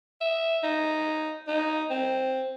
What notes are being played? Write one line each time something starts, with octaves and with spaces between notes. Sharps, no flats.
E5
D#4
D#4
C4